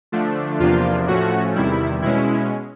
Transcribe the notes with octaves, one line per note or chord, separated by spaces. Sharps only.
D3 F3 A3 D4
E2 C3 F3 A#3 D4 F4
A2 F3 A3 C#4 F#4
E2 C3 D#3 G3 E4
B2 G#3 C#4 E4